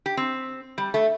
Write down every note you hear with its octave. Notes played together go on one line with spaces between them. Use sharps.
G4
C4
G3
A3